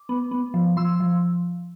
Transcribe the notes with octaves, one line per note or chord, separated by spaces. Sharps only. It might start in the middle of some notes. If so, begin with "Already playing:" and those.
Already playing: D6
B3
B3
F3
F3 C6 E6
F3